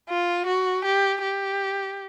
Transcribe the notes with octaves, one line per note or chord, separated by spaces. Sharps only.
F4
F#4
G4
G4